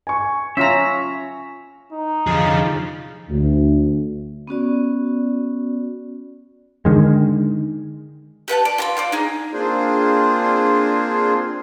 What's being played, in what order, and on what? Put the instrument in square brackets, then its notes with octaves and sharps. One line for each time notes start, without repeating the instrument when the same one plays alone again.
[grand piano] G#5 C#6
[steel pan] C#4 F4 A#5 [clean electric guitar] E5
[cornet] D#4
[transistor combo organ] F2 D3 F3 [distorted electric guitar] G#4 F5
[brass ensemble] D2
[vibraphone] B3 C#4 F#4 D5
[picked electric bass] D3 D#3 G#3
[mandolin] G4 B4 F#5 A5
D5
F4 A#5 B5
F4 C5 D5
D#4 G#4
[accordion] A#3 C4 D4 F4 G#4 C5